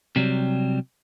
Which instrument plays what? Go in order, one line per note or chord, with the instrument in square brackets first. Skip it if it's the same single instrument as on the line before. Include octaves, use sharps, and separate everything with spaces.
[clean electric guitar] C3 F#3 G3